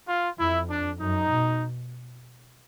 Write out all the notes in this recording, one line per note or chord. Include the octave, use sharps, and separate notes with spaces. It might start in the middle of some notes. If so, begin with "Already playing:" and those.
F4
F2 E4
D4
F#2 D#4
B2